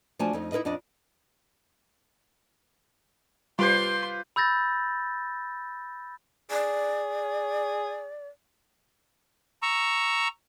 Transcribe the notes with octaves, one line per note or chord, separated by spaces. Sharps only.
F3 A3 D4 F#4 G#5 A5
F2 A3 D#4
D#4 E4 A#4 B4 D#5
F2 D4 D5 D#5
G3 F4 B4 C5 C6 D6
B5 E6 G6 A6 A#6
G#4 D5
A#5 C#6 E6